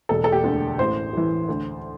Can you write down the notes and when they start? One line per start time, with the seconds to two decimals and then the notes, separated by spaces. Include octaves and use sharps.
0.09 E1 A4
0.24 A4
0.32 G4
0.44 D2 D3
0.78 A1 C5
1.13 A2 E3
1.49 D2